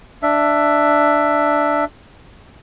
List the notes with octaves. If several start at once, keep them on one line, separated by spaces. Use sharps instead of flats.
D4 E5